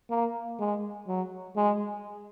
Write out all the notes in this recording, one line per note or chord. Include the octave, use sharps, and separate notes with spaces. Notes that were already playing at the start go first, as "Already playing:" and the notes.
A#3
G#3
F#3
G#3